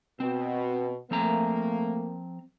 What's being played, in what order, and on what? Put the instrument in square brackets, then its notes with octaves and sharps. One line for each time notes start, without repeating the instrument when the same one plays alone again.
[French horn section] B2 [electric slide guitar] C4
[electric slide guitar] F3 C4 A#5 [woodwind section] A3 [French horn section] A#3